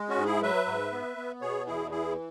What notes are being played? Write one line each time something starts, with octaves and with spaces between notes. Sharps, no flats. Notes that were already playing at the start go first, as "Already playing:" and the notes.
Already playing: G#3
C#4 F#4
G#2
E4 G#4
F#3 B4 E5
G#2
B3
B3
B2 G#4 C#5
E2 E4 G#4
E3 E4 G#4